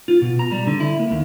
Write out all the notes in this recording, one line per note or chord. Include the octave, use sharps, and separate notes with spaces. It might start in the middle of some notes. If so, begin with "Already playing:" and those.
F4
B2
A#5
G3
D3
E4
A#3
D#2